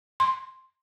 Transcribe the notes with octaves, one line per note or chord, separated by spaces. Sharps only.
C6